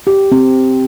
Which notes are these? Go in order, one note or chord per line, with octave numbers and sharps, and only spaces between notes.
G4
C4